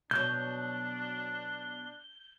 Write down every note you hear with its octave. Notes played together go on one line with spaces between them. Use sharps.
B2 F#3 D4 G6